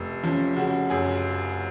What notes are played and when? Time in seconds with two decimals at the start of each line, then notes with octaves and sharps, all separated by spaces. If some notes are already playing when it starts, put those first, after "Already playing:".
Already playing: F1
0.23 F3 C#4
0.56 C#3 F#4
0.90 F#2 G#4